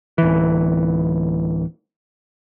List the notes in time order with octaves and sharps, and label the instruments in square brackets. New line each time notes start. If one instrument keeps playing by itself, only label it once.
[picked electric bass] D1 E3